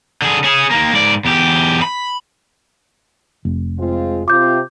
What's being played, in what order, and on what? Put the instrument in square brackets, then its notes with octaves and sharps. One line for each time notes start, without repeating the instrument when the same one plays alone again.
[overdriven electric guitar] D3 G#4
C#4 G#4
D#2 A#3
G#2 D5
E2 G4
B5
[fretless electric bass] F1
[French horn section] G#3 C4 F4
[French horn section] C3 C4 F4 [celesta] D6 G6